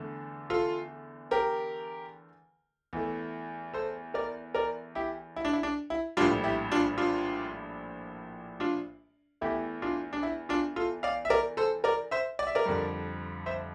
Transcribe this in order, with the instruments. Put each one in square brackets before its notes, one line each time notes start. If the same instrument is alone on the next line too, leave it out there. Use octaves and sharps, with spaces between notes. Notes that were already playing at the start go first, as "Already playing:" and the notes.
Already playing: [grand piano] E2 D3 A3
F4 A4
G4 A#4
E2 E3 A3
A4 C5
A#4 D5
A#4 D5
E4 G4
E4
D4
E4
D4
E4
A#1 A2 G3 D4 F4
E4 G4
D4 F4
D4 F4
D4 F4
E2 E3 A3 E4 G4
D4 F4
D4
E4
D4 F4
F4 A4
D5 F5
E5
A#4 D5
A4 C5
A#4 D5
C5 E5
D5
E5
A#4 D5
F2 D3 G3
C5 E5